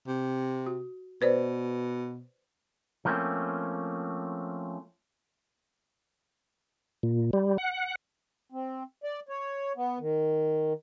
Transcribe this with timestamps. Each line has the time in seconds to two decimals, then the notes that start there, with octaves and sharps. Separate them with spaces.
0.08 C3
0.66 F#4
1.22 B2 B4 C5 D5
3.05 F3 A3 A#3 C4 C#4
7.03 A#2
7.33 G3
7.58 F#5
8.52 C4
9.04 D5
9.29 C#5
9.76 B3
10.00 D#3